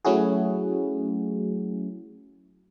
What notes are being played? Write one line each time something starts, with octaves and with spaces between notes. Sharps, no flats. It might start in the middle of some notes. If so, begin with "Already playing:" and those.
F#3 A3 C#4 E4 F#4 G#4